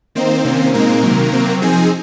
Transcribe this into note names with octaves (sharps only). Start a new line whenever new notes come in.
D#3 A#3 C4 D#4 C5
C3 D#3 A#3 C#4
A#2 G#3 A#3 C4 D#4 A#4
C3 D#3 F#3
C3 F#3 C4
F3 C4 D#4 G#4 G#5